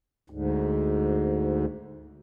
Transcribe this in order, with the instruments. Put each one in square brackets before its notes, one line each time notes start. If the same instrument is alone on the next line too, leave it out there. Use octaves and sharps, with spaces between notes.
[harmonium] D2 G#2